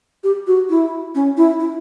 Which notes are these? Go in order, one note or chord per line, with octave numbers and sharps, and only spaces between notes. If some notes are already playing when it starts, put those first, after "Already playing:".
G4
F#4
E4
C#4
E4
E4